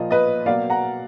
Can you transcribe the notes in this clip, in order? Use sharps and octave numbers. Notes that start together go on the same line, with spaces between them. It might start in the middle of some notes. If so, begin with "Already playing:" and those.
Already playing: A#2 F3 A#3 F4 D#5
B4 D#5
B2 F#3 A#3 D5 F5
F#5 A#5